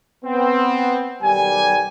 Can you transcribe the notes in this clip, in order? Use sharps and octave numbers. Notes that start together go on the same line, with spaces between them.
B3 C4
B1 D#3 G3 G4 G#5